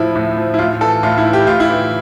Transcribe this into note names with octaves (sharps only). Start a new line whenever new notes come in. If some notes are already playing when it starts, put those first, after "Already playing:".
Already playing: A2 F3 E4
A2
F3
E4
A2 F4
E3 A4
A2 F4
E4
E3
G4
A2 F4
E4
E3